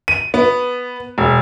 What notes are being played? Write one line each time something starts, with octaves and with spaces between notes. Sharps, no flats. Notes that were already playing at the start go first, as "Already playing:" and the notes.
D#7
B3
E1